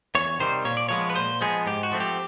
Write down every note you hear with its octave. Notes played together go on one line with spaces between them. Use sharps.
E2 C#5
C3 D#3 G3 C5
A#2 C#5
D5
F3 G#3 B3 C#5
B4
A#2 C5
F3 G#3 B3 G#4
G#2 G4
F#4
F3 A3 C4
G4